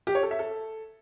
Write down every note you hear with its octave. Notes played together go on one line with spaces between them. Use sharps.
G4
C#5
A4
E5
A4